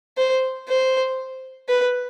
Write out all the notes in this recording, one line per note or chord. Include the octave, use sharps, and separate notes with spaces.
C5
C5
B4